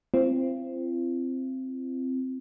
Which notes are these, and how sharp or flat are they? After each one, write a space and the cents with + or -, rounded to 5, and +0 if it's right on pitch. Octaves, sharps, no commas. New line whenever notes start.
C4 +0 F4 -45